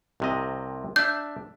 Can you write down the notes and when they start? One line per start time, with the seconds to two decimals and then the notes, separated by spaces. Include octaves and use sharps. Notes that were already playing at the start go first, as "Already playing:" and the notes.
0.20 C2 C3 D#5
0.96 D4 E5 G6